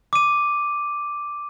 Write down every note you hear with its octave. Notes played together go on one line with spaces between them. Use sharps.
D6 D#7